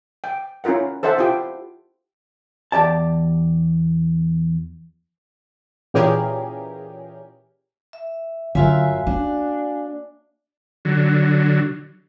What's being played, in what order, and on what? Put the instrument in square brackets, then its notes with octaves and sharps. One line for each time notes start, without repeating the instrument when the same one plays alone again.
[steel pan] G5
C#4 E4 F4 A#4 F#5
A4 C5 E5 F#5 A5
E4 F4 G4 G5
[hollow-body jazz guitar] E2 G4 D5 A5
[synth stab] A#2 E3 C#4 G4 G#4 A#4
[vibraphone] E5
[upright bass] G1 [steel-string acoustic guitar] F#2 F4 E5 [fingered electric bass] D3 [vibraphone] F#4 F5 G#5
[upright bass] A#3 [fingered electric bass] B3 C#4 [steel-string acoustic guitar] D4
[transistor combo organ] D3 F#3